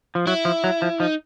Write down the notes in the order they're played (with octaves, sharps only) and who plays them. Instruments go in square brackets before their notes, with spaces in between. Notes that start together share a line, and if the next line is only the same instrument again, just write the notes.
[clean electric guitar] F3
[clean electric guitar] F#3 [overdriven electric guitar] E4
[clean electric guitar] F3
F#3
F3
[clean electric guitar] F3 [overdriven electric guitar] D#4